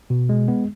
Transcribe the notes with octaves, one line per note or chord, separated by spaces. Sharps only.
B2
G#3
B3